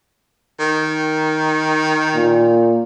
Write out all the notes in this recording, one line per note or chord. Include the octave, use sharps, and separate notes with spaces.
D#3
A#2